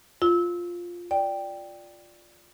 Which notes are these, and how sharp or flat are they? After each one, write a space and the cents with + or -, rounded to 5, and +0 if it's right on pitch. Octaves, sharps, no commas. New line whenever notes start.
F4 +0 E6 -25
D5 +0 G5 +0